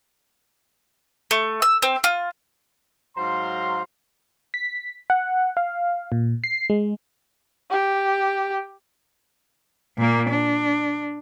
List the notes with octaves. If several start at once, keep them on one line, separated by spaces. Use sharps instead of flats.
A3
E6
C4
F4
G#2 F#3 C5 F5 A#5 C6
B6
F#5
F5
A#2
C7
G#3
G4
A#2 A#3
D4